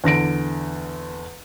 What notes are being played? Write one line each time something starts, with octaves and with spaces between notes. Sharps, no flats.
E2 D3 A#6 D7